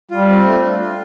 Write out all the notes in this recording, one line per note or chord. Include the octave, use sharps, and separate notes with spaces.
G3 F4
C4
A3
D4
F4